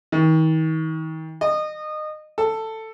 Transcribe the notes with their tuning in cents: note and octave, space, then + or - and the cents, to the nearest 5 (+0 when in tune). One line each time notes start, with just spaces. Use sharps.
D#3 +40
D#5 -25
A4 +10